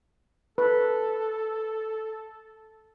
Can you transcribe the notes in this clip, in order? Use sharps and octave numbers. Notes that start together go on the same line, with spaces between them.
A4 B4